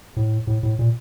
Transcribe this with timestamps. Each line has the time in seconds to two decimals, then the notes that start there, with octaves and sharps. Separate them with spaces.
0.17 A2
0.47 A2
0.63 A2
0.79 A#2